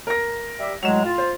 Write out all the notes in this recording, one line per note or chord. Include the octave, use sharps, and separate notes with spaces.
A#4 A#6
G3 G4 E5
A2 F#3 G#3 E7 F7
F4
C5